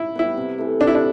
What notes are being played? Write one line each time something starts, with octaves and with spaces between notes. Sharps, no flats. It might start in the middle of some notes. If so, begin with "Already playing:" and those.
Already playing: E4
G3 B3 E4
C3
E3 A3
C3 D4
E4
D4